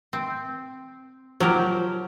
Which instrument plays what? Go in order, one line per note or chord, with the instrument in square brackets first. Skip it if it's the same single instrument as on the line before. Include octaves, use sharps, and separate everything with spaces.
[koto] C4
[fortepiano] F3 [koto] F#3 G4 A#4